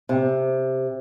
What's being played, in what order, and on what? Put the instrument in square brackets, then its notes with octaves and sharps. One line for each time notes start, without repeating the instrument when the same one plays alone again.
[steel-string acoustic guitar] C3